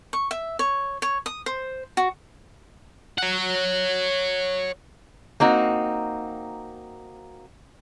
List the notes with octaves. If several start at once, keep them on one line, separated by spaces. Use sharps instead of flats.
C#6
E5
C#5
C#5
D#6
C5
F#4
C#5 F#5
A#3 C4 D#4 F#4